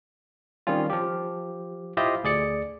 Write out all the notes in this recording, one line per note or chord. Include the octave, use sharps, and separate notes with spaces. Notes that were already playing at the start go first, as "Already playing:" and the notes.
D#3 G3 C4 C#4 F4
F3 G4
E4 F4 G4 C5 D#5 E5
D2 G#4 D5 C#7